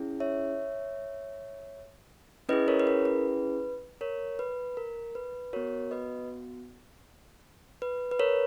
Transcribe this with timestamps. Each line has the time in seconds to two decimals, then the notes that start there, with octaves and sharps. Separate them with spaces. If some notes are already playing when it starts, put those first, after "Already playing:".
Already playing: C#4 E4 G#4
0.20 C#5 E5
2.49 C#4 E4 G#4 B4 D#5
2.68 A#4 C#5
2.79 B4
2.87 A#4
3.05 B4
4.01 A#4 C#5
4.39 B4
4.77 A#4
5.15 B4
5.53 B3 F#4 A#4 C#5
5.91 B4 D#5
7.82 B4
8.11 B4
8.19 A#4 C#5